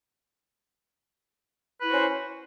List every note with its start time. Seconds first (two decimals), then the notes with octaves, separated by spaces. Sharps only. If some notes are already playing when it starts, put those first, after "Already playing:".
1.79 B4
1.83 E4
1.87 F#4
1.90 C5
1.94 C#4